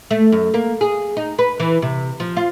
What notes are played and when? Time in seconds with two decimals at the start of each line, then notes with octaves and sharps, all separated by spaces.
0.11 A3
0.32 F#2
0.54 A#3
0.81 G#4
1.17 D#4
1.39 B4
1.60 E3
1.82 C3
2.20 F3
2.37 F4